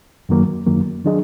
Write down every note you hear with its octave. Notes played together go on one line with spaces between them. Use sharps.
F#2 D#3 F#3 A#3
F#2 D#3 F#3 A#3
D#3 F#3 D4 G#4 D#5